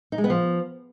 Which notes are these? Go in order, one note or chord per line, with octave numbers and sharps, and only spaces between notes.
D#4
G#3
B3
F3